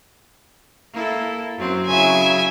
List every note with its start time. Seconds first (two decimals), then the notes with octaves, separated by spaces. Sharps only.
0.93 A#3 E4 A4
1.57 F#2 F#3 C4
1.87 C#3 F#3 E4 E5 G#5